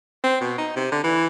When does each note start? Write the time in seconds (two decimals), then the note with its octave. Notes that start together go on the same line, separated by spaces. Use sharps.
0.24 C4
0.41 B2
0.58 D#4
0.76 C3
0.92 D3
1.04 E3